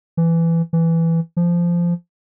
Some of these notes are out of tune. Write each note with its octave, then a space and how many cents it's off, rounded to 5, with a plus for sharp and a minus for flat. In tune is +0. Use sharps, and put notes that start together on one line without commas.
E3 +15
E3 +5
F3 -15